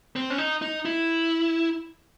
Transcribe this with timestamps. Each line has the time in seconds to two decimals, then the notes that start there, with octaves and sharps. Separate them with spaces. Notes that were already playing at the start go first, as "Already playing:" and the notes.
0.16 C4
0.30 C#4
0.38 D#4
0.62 D#4
0.85 E4